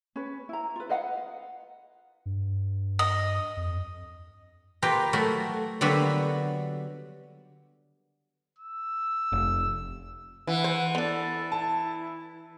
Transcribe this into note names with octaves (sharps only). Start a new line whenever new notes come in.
C#4 B4
E4 A#5
F4 B4
B4 D#5 F5 F#5
G2
D#5
F2
A#3 F4 G4 B4 G5 A#5
F#3 A3 F#4 A#4
D3 F#3 G3 A#3 B3 F#4
E6
F1
E3 F#5
C5
B3 D4 A4
E4 A5